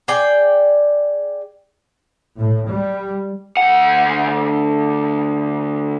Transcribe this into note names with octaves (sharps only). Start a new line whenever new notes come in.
G#4 D5 G5
A2
G3
D2 F#5